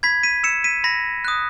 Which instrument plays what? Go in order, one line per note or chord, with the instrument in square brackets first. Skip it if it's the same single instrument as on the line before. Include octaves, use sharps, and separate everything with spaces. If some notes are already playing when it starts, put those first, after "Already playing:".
[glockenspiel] B5 G#6 B6
B6 D#7
E6 C#7 E7
B6 D#7
B5 A#6
D#6 F#6